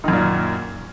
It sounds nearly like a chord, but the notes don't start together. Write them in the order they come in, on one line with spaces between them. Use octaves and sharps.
D#3 F#2 A#2